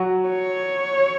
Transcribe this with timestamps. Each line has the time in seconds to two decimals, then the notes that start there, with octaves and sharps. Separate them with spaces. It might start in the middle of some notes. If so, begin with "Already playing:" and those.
Already playing: F#3 F#4
0.28 C#5